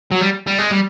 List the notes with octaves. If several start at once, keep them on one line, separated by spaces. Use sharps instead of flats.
F#3
G3
G3
G#3
G3